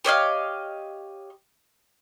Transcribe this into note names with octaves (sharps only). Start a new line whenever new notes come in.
G4 C#5 D#5 F5